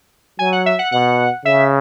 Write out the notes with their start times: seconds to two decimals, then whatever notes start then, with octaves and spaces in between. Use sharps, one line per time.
0.39 F#3 G#5
0.52 F#5
0.66 E5
0.79 F#5
0.92 B2 F#5
1.45 C#3 E5